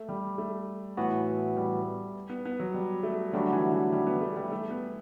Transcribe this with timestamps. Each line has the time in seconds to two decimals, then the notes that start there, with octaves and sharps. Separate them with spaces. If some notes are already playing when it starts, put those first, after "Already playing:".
Already playing: A3
0.09 G3
0.38 A3
0.97 A2 E3 B3 F#4
1.57 G3
2.29 B3
2.45 B3
2.60 F#3
2.74 G3
3.03 A3
3.33 D3 F#3 G3 A3 D4 F#4
3.53 E3
3.72 E3
3.93 G3
4.06 B3
4.21 A3
4.36 G3
4.52 A3
4.71 B3